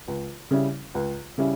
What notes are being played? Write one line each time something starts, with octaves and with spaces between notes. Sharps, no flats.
C#2
C#3 G3 C#4 E4
C#2
C#3 G3 C#4 E4